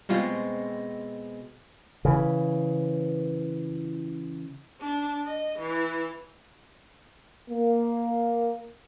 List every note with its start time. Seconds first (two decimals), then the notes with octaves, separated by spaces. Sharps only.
0.09 B2 G3 G#3 C4 F4
2.05 C#3 E3
4.81 D4
5.26 D#5
5.59 E3
7.49 A#3